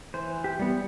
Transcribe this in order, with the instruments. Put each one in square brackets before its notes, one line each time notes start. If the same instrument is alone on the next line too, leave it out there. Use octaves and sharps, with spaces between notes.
[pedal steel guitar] E3 C5
G4
G3 B3